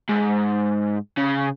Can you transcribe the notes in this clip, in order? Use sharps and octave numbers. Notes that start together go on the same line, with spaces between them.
G#2
C#3